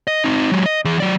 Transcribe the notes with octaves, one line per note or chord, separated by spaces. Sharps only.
D#5
C4 D#4
F#3 G#3
D#5
E3 G#4
F#3 D5